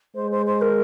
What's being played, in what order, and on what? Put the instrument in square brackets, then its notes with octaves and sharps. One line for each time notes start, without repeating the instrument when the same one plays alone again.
[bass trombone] G#3 [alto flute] C5
[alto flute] C5
C5
A#4